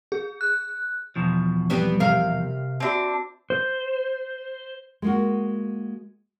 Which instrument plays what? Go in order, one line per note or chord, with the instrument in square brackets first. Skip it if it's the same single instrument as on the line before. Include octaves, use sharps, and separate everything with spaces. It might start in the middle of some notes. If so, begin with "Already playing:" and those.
[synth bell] G#4
F#6
[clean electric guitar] E2 B2 F3
[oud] G3 B3 C4
[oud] C3 A#4 [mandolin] F5
[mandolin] C4 D4 [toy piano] F#4 E5 A5
[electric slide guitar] C5
[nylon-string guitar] G#3 A#3 F#4